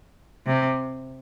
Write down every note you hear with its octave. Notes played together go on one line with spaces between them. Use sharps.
C3